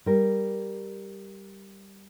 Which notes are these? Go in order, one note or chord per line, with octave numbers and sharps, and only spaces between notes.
G3 A#4